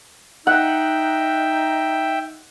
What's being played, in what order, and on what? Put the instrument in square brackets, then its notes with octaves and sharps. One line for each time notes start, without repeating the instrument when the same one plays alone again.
[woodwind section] D#4 [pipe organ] E5 G5 [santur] F#5